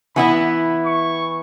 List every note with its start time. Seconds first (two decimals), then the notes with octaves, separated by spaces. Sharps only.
0.16 E3 B3 E4 B5
0.86 C#6